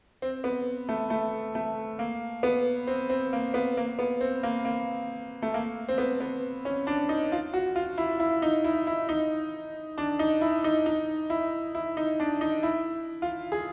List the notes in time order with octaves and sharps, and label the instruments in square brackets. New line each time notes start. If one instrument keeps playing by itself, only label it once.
[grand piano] C4
B3
A3
A3
A3
A#3
B3
C4
C4
A#3
B3
A#3
B3
C4
A#3
A#3
A3
A#3
C4
B3
B3
C#4
D4
D#4
F4
F#4
F4
E4
E4
D#4
E4
E4
D#4
D4
D#4
E4
D#4
D#4
E4
E4
D#4
D4
D#4
E4
F4
G#4